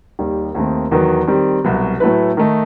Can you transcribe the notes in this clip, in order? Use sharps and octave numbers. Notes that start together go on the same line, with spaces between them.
D#2 D#3 G3
D#2 D#3 A3 C4
E2 D#3 F#3 B3
D#3 G3 C4
C2 B2 F#3
A2 F#3 A3 E4 B4
D#3 A3 D#4